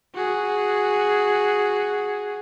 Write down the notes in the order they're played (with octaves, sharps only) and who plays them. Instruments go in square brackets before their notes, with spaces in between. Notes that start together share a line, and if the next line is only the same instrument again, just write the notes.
[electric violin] F#4 G#4